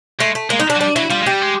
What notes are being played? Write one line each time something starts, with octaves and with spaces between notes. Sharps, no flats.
G#3 A3
A3
G#3 A#3
D#4
D4
F#3
G3 D4
F#3 E4
G3 F4
G#3
G3 G4
G#3